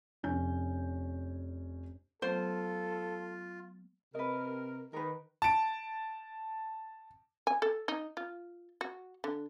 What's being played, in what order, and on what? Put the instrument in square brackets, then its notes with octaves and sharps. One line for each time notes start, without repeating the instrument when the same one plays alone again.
[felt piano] F1 C#4 C#5 G6
[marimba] F#3 A3 B3 [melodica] F4 [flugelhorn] A4 [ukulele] C5
[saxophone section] C3 A#4 [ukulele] B4 D#5
[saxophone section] D#3 [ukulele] A#4 B4
[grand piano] A5 D7
[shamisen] G#5
A4
D#4
F4
F#4
D3